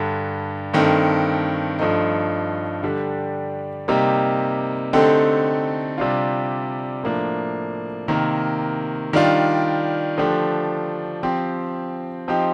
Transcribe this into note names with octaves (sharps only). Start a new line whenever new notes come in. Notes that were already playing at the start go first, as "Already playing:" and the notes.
Already playing: G2 D3 G3
G2 D#3 A3 C4
G2 F3 A3 D#4
D3 G3 D4 G4
C3 G3 A#3 D#4 G4
D3 A3 C4 D#4 G4
C3 G3 D4 F4
A2 F3 A#3 D4
C3 D#3 A#3
D#3 G3 D4 F4
D3 F3 A3 D4 G4
F3 C4 G4
F3 C4 D#4 G4